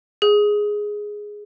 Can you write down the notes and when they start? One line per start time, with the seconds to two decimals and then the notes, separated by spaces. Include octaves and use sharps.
0.22 G#4